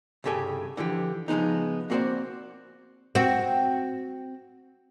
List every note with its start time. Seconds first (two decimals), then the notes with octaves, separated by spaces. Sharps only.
0.24 C2 G2 C#3 G4 A4 G#5
0.77 D3 E3 F3 G4
1.28 C#3 F3 G#3 B3 D#4
1.90 A#3 C4 F#4 G4 C5 D5
3.15 C4 F#4